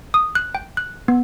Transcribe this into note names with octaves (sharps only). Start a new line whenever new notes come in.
D#6
F#6
G5
F#6
B3